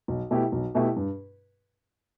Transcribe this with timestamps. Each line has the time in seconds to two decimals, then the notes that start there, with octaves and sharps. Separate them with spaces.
0.08 B1
0.31 B2 A3 E4 G4
0.52 B1
0.75 B2 A3 E4 G4
0.96 G2